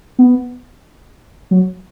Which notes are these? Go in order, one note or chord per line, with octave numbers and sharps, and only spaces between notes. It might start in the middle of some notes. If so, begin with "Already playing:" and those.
B3
F#3